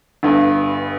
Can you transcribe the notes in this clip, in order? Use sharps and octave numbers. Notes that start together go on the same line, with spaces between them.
G1 G2